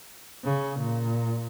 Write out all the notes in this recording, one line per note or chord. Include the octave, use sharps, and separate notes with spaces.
C#3
A#2